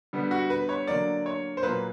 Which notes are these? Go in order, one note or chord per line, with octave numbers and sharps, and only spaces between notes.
D3 G3 B3
F#4
B4
C#5
D3 F#3 A#3 D5
C#5
C5
A#2 F#3 A#3 B4